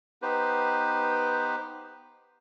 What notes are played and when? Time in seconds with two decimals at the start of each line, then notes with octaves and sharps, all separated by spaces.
0.22 B3 D#4 G4 B4 C5